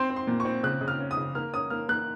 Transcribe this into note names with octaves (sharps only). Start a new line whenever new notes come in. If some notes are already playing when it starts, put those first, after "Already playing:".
Already playing: C4 C6
C4
C6
A#2
C#6
C4
C#3 F#6
C#3
F6
C#4
D#6
C#3
A#3 F6
C#4 D#6
A#3 F6
A#3 F#6